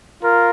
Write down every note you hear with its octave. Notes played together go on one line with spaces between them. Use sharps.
F4 A#4